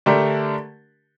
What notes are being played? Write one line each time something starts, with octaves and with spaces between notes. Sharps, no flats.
D3 A3 D4 G4 A#4